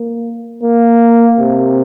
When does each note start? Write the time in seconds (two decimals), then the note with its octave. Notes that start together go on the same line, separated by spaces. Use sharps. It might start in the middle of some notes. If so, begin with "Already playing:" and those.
Already playing: A#3
0.63 A#3
1.40 C3